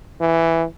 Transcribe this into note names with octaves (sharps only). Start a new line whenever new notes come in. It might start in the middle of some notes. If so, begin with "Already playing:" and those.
E3